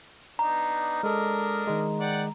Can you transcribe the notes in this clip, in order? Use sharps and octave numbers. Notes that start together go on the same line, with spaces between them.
B3 D4 D#4 A#5
G#3 D4 A4 A#4 D#5
D#3 G#3
D5 F#5 G5